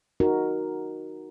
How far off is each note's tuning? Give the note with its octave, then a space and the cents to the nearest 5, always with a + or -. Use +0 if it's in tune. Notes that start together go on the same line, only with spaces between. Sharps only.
D#4 +0 F#4 +0 A#4 +0